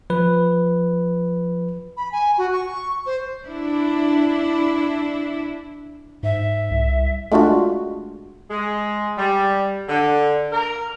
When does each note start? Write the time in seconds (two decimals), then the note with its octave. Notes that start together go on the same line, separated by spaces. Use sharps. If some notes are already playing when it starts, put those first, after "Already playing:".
0.10 F3 B4
1.97 B5
2.12 G#5
2.38 F#4
2.53 C#6
3.06 C5
3.47 D4 E4
6.23 G#2 E5
6.71 C2
7.32 G#3 A3 D4 F4 F#4
8.50 G#3
9.18 G3
9.89 D3
10.52 A#4